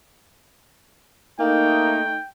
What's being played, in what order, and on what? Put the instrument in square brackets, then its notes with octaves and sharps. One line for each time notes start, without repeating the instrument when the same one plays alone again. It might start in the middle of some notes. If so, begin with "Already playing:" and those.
[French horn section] A3 D#4 [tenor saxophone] A#3 [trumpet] G5